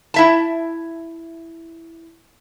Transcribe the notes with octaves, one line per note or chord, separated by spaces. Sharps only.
E4 E5 A5